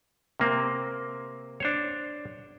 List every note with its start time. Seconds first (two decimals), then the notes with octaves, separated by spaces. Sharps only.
0.40 C3 A#3 C4
1.60 D4 C5 C#5